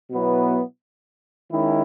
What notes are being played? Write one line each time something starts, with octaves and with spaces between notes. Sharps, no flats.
B2 F#3 B3 E4
D#3 G#3 C#4 E4